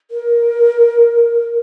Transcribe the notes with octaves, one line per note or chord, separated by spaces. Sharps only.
A#4